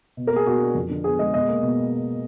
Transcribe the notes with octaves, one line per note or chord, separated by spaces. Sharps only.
B2
A#4
A#3 G#4
B2 F#4
D4
F2
D3
B3 G#4
G#3 D#5
B2 D#5
A#3
B2